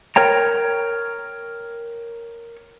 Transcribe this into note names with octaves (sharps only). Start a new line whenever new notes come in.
A#4 C#5 G5 A#5